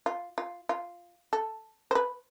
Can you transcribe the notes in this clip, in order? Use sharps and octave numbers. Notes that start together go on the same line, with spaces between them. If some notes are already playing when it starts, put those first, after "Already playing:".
F4
F4
F4
A4
C5
B4